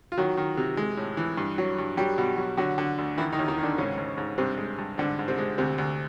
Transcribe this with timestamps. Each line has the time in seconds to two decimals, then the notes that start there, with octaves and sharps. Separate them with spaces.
0.12 F4
0.17 D#3 F#3 F#4
0.37 D#3
0.57 C3
0.77 G#3
0.97 A2
1.17 E3
1.38 G2
1.58 F#3
1.78 G2
1.97 F#3 G3 G4
2.18 B2
2.37 F#3
2.57 D3 F#3 F#4
2.78 D3
2.98 D2
3.18 D#3 E3 E4
3.33 D#3 D#4
3.39 D#2
3.48 D#3 D#4
3.58 D3 D#3 D4
3.78 G#2 C#3 C#4
3.98 G#2
4.18 G#2
4.38 G2 C3 C4
4.58 G#3
4.79 G2
4.98 G#2 D3 D4
5.19 G#2
5.28 C3 C4
5.38 G#3
5.58 D2 C3 C4
5.78 D2